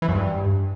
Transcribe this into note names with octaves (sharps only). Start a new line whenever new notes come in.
E3
F#2
G2